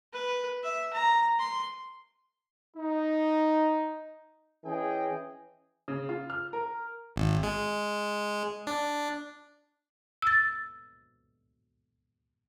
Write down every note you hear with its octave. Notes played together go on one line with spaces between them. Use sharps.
B4
E5
A#5
C6
D#4
E3 C#4 G#4 D#5 G5
C#3
F4
F6
A#4
G#1
G#3
D4
E6 A6